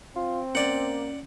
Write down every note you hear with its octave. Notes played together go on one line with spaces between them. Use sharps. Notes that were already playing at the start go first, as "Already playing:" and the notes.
C4 F4
A#3 C#4 D5 F#5